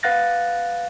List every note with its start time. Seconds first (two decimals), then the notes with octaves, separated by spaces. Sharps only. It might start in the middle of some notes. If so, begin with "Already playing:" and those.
0.03 B4 F5 F#5 F#6 A6 A#6